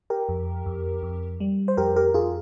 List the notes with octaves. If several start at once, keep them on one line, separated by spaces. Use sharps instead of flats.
G4 A#4
F2
F2
F2
G3
C5
F2 G4 A#4
G4 A#4
F2 F4 G#4